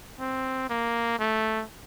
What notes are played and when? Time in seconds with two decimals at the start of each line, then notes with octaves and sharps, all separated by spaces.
0.20 C4
0.70 A#3
1.19 A3